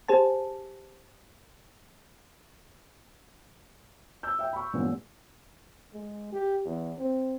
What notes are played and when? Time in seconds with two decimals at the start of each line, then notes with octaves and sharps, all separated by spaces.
0.08 G4 G#4 C5 G#5 A5
4.23 E6 G6
4.39 E5 G5
4.53 B5 C#6
4.73 E2 G2 A#2 G#3 B3 C#4
5.93 G#3
6.32 G4
6.65 E2
6.98 C4